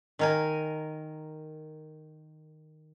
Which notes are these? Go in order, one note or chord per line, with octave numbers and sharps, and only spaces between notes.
D#3 A#4 G#5